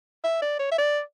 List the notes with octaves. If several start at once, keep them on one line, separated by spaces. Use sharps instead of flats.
E5
D5
C#5
E5
D5